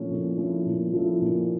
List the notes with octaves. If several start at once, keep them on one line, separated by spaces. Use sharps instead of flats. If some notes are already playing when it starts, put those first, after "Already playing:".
Already playing: A#2 F3 A3 C#4 E4
A#2
F3 A3 C#4 E4
A#2
F3 A3 C#4 E4
A#2